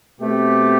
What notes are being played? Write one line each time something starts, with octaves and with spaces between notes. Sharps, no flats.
B2 A3 C4 G4